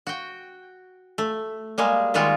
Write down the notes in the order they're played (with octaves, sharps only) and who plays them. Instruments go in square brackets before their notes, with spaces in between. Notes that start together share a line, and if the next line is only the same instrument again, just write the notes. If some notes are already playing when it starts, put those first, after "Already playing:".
[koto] F#4 G5
A3
G3 G#3 A#3 G#4
D#3 G3 G#3 F4 F#4